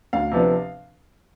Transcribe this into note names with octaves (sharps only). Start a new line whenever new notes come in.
D2 F5
C3 F3 B3 D4